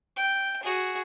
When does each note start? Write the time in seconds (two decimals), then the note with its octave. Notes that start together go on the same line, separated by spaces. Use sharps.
0.17 G5
0.63 F#4 G#4